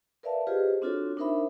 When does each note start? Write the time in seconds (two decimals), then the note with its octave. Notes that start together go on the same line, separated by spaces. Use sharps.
0.23 A#4 B4 D5 E5 F5 A5
0.47 F4 G4 G#4 B4 C5 D#5
0.82 C4 D4 F4 F#4 A4 C#5
1.17 D4 D#4 A#4 C5 E5 B5